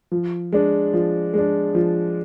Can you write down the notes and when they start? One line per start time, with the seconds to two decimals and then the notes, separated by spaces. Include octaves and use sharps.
0.11 F3
0.52 G#3 D4
0.93 F3
1.34 G#3 D4
1.75 F3